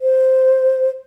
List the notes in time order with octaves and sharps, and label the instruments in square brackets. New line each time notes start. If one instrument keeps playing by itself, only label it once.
[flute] C5